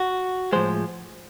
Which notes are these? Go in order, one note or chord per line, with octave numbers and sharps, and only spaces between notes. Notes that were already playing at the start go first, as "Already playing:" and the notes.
Already playing: F#4
A2 F3 G#3 C5